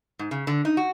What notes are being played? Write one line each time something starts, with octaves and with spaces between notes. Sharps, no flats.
G#2
C#3
D3
D#4
F#4